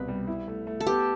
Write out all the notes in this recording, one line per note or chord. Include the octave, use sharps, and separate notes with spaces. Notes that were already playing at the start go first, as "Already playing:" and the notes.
Already playing: C2 B2 B4
G3
E4
A3
A3
A4
B3 G4